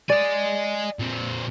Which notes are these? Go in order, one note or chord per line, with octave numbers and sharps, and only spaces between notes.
D5 D#5 G#5
A#2 C4